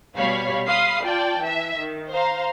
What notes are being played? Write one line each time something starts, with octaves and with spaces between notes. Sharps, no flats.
B2 G3 C#5 F5 B5
F5 B5 C6 D#6 C7
F4 D5 G5 A5
E3 E5
D#3
C5 F5 A#5 C6